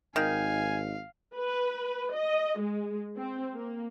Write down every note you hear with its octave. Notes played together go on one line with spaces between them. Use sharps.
G#1 D#3 F5 G#5
B4
D#5
G#3
C4
A#3